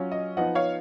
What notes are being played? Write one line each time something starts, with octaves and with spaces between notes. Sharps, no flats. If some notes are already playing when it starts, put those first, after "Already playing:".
Already playing: F#3 C#4 F4
D#5
F3 B3 D#4 D#5 F#5
C#5 F5